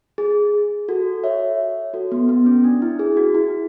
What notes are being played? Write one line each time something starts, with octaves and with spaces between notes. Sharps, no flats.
G#4
F#4 A4
C#5 E5
F#4 A4
B3
B3
C#4
D4
E4
G#4
F#4
E4